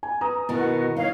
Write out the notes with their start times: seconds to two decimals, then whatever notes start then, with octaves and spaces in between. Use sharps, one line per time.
0.03 G#5
0.21 B4 A#5 D#6
0.49 B2 D#3 B3 E4 F#4
0.97 D#4 C#5 F5